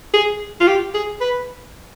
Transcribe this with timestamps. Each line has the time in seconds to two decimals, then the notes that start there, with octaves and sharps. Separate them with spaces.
0.14 G#4
0.61 F4
0.68 G4
0.94 G#4
1.21 B4